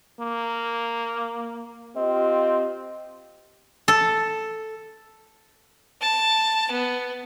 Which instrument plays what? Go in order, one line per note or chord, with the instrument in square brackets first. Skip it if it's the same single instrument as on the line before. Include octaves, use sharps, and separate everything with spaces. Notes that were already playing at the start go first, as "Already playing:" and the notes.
[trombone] A#3
[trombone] C4 [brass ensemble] F4 G4 D#5
[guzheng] A4
[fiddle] A5
B3